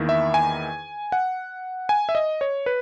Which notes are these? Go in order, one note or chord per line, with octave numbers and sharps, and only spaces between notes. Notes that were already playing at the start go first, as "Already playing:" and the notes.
Already playing: E2 D#3 A#3 E4
E5
G#5
F#5
G#5
E5
D#5
C#5
B4